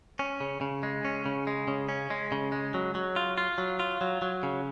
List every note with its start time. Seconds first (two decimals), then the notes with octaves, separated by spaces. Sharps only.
0.19 C#4
0.40 C#3
0.61 C#3
0.83 G#3
1.05 C#4
1.26 C#3
1.47 G#3
1.68 C#3
1.89 C#4
2.10 G#3
2.32 C#3
2.52 G#3
2.74 F#3
2.95 F#3
3.16 F4
3.38 F4
3.58 F#3
3.80 F4
4.01 F#3
4.22 F#3
4.43 C#3